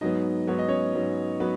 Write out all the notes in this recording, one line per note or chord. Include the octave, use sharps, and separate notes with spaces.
G#2 F#3 B3 D#4 D#5
G#2 F#3 B3 C#5
D#5
C#4 C#5
G#2 F#3 B3
F#3 B3 B4